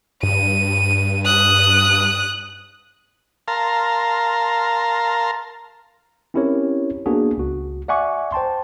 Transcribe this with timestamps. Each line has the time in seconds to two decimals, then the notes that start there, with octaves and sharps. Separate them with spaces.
0.23 G2 D#7
1.26 D#6 F#6
3.48 A#4 F5 A5 A#5 C6
6.34 C4 C#4 E4 G4 A#4 C#5
7.06 A#3 B3 D4 F#4 G#4
7.37 C#2 F#4
7.88 D5 E5 F#5 G#5 C#6 D6
8.32 C5 G5 A5 C6